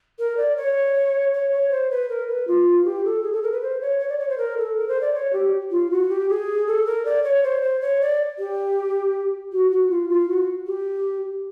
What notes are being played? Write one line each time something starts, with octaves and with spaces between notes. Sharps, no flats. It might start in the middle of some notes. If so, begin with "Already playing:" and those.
A#4
D5
C#5
C#5
C#5
C5
B4
A#4
B4
F4
G4
A4
G#4
A4
A#4
B4
C5
C#5
C#5
D5
C#5
C5
A#4
A4
A#4
C5
D5
C#5
G4
F4
F#4
G4
G#4
A4
A#4
D5
C#5
C5
C5
C#5
D5
G4
F#4
F#4
F4
F4
F#4
G4